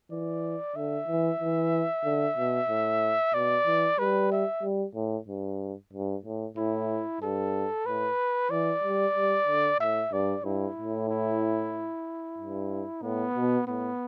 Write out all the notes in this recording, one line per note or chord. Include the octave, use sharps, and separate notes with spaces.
E3 D5
D3 E5
E3
E3
D3
B2
A2
B2 D5
E3
G3 B4
E5
G3
A2
G2
G2
A2
A2 E4
G2 A4
A2 B4
E3 D5
G3
G3
D3
A2 E5
G2 D5
G2 E4
A2
E4
G2
A2 B3
B2
A2 B3